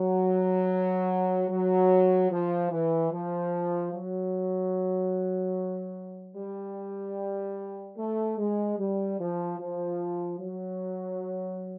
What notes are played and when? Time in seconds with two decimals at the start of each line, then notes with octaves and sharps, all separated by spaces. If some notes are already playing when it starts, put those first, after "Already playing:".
Already playing: F#3
1.49 F#3
2.31 F3
2.71 E3
3.12 F3
3.93 F#3
6.35 G3
7.97 A3
8.38 G#3
8.78 G3
9.19 F3
9.59 F3
10.40 F#3